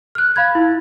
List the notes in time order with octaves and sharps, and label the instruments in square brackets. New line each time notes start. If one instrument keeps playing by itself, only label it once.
[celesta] F6 F#6
F5 B5 G#6
E4